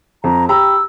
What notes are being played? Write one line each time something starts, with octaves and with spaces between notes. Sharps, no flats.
F2 A#5
G4 A#5 B5 E6